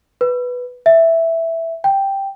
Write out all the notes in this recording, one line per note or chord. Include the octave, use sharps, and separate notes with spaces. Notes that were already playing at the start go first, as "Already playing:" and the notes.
B4
E5
G5